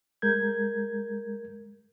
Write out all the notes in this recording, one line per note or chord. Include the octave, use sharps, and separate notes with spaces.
G#3 A#4 G6 G#6